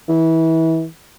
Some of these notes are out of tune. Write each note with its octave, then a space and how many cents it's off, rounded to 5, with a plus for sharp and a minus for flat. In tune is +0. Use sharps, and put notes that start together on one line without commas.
E3 -25